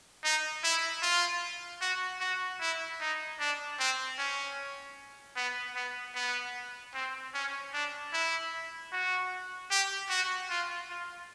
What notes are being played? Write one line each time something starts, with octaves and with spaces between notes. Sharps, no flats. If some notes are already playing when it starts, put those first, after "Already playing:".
D#4
E4
F4
F#4
F#4
E4
D#4
D4
C4
C#4
B3
B3
B3
C4
C#4
D4
E4
F#4
G4
F#4
F4
F4